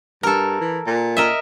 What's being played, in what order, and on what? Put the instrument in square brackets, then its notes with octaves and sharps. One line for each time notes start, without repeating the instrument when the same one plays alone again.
[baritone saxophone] G2 [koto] A4 A#4
[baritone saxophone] E3
A#2
[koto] A#4 D#5 E5